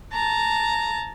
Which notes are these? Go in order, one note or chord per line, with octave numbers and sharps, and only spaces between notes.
A5 A#5